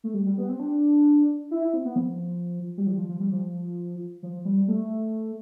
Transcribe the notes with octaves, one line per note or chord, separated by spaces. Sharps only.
A3
G3
G3
B3
C4
D4
E4
E4
C4
B3
F3
G3
F3
F3
F3
G3
F3
F3
G3
A3